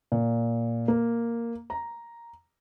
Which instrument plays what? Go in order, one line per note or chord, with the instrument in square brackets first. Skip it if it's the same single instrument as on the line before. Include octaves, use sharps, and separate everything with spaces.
[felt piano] A#2
A#3
A#5